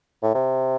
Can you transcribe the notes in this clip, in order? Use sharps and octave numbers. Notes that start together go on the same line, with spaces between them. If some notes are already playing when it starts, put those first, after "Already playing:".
A2
C3